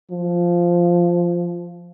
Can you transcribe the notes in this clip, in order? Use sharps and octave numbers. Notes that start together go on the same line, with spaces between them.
F3